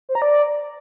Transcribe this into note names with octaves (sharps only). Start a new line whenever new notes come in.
C5
A#5
D5